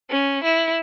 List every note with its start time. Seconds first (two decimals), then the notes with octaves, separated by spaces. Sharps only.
0.10 C#4
0.44 E4